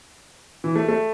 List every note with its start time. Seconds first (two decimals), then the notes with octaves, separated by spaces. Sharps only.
0.64 E3
0.76 A3
0.88 A3